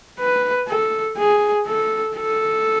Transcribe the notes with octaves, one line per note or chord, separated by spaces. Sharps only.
B4
A4
G#4
A4
A4